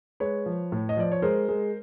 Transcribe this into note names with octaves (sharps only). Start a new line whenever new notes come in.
G#3 B4 C#5
F3
A2
D#5
F3 D5
C#5
G#3 A#4 C5
G#3